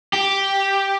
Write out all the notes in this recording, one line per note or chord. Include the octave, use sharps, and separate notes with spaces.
G4